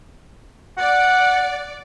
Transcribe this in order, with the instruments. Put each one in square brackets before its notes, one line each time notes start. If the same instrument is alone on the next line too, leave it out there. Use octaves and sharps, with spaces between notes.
[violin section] D5 [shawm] F#5